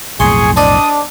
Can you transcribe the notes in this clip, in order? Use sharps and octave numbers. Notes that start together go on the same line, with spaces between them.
B1 F2 A2 G#4 G#5 C6 C#6
D4 C5 D5 D#5 D#6